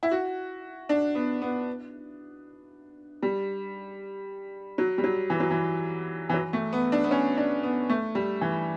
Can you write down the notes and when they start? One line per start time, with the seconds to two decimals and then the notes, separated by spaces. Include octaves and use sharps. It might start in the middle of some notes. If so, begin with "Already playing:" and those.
0.03 E4
0.11 F#4
0.89 D4
1.15 B3
1.42 B3
3.22 G3
4.78 F#3
4.98 G3
5.04 F#3
5.30 E3
5.40 F#3
5.50 E3
6.29 E3
6.34 F#3
6.53 A3
6.73 B3
6.92 D4
7.04 B3
7.11 C#4
7.37 D4
7.63 B3
7.89 A3
8.15 G3
8.41 E3